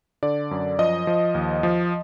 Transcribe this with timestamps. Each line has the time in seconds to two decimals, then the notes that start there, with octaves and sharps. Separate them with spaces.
0.23 D3 D5
0.51 F#2
0.79 F3 D#5
1.07 F3
1.35 D#2
1.63 F3